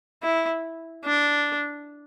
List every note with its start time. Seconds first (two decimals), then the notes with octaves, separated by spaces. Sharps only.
0.23 E4
1.05 D4